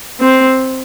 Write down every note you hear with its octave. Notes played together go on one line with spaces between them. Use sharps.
C4